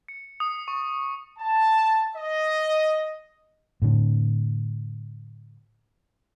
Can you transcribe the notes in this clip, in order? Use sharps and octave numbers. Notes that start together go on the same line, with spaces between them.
C#7
D#6
C#6
A5
D#5
A2 D3